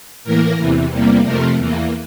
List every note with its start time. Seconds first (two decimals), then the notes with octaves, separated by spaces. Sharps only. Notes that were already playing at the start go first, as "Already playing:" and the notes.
0.24 A2 E3 A#3 A#4
0.57 E2 C3 E3
0.91 E2 C3 G3 A#3
1.24 F2 C3 F3 A3 A#4
1.57 E2 E3 A#3